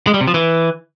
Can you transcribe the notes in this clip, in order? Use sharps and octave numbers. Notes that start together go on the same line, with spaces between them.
G#3
G3
C3
F3
E3